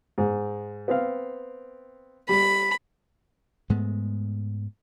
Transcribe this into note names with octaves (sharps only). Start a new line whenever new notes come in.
G#2
B3 C4 F5
G3 B5
G#2 G#3 A3 B3